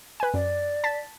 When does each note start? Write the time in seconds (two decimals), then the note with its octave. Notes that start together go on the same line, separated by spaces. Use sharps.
0.20 B4 G#5
0.34 F#2 D5
0.84 A5 A6 B6